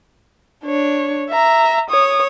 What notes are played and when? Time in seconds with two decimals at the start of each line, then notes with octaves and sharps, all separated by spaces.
0.65 D4 C#5
1.30 E5 A#5
1.90 C#5 D#6